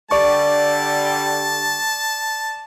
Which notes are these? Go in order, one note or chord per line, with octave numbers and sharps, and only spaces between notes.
D3 G3 D5 A5 C#6